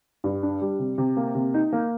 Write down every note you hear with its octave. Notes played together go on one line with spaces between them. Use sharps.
G2
D4
G3
C3
C3
A#3
C3
D#4
A#3